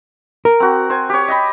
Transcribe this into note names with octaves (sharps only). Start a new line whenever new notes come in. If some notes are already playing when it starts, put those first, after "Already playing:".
A#4
C4 F#4
C5 G#5
G4 C#5
D#5 G5 B5